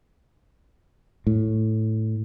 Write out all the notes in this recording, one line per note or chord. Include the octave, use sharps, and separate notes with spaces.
A2